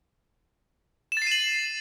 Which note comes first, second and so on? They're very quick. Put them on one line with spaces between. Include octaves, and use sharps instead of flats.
E7 A6 C7 D#7 F#7